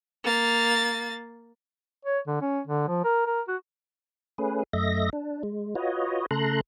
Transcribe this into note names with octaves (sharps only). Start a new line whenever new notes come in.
A#3 A6
C#5
D3
C#4
D3
F3
A#4
A#4
F#4
A3 C#4 G#4 B4
F#2 A3 D#5 E5 A#6
D4
G#3
F4 F#4 B4 C#5 D#5
C#3 A3 A4 A#5 C6 F#6